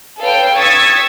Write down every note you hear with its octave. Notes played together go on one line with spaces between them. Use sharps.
A4 B4 C#5 F5 G5
C#6 D#6 E6 G#6 A6 B6